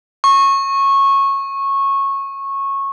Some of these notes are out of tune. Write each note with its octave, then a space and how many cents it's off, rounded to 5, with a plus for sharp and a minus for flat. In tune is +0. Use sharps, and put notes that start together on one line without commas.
C#6 -15